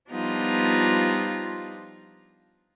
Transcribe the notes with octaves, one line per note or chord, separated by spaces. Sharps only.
F3 G3 B3 D4 D#4 F4